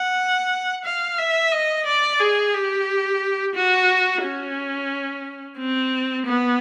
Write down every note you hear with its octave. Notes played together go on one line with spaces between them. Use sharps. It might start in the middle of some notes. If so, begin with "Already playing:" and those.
Already playing: F#5
F5
E5
D#5
D5
G#4
G4
F#4
C#4
C4
B3